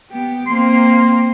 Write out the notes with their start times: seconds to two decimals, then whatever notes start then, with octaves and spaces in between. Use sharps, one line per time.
0.10 B3 G4
0.47 A#3 C4 C6